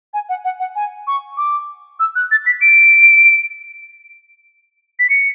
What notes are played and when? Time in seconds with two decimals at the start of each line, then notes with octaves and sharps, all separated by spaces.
0.14 G#5
0.29 F#5
0.45 F#5
0.60 F#5
0.75 G#5
1.07 C#6
1.37 D6
2.00 E6
2.16 F#6
2.31 A6
2.46 B6
2.61 D7
4.99 B6
5.10 C#7